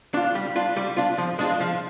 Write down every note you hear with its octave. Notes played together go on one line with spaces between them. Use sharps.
D4 F4
G3
D4 F4
G3
D4 F4
F3
G#3 D4 F4
F3